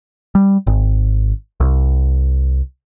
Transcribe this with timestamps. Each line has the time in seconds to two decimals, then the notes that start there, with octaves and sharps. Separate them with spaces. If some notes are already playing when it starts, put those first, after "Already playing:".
0.35 G3
0.67 G#1
1.60 C2